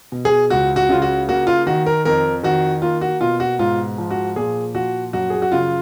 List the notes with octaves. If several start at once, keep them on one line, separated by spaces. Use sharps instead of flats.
B2
G#4
C#2 F#4
F#4
C#3 F4
F#4
A#3 F#4
F4
D#3 F#4
A#4
F2 A#4
D#3 F#4
A#3 F4
F#4
B2 F4
F#4
G#2 F4
F3
F#4
A#2 G#4
F3 F#4
F#2 F#4
G#4
F#4
C#3 F4